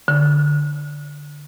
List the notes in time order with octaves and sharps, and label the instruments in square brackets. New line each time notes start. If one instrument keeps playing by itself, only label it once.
[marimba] D3